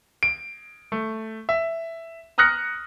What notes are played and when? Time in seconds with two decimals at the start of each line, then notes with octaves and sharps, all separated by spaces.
0.23 D7
0.92 A3
1.49 E5
2.38 A#5 D#6 F6 F#6 A#6 C#7